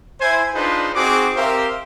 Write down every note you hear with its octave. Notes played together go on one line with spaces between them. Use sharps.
E4 C5 G#5
D4 D#4 F4 G#4 B4 C5
C4 D#4 F#4 G#4 D6
C4 G4 A#4 C5 E5 F5